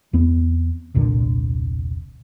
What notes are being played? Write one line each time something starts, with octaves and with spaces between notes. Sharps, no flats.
E2 B3 C4
E1 C2 A#2 D3